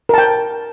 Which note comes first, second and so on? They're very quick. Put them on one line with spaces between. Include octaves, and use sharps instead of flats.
A#4 A5 G5